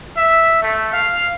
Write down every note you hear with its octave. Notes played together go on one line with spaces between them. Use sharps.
E5
A3
F5